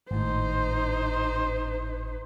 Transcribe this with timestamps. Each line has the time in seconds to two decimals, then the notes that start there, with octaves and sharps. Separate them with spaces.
0.11 G#1 A2 D#4 C5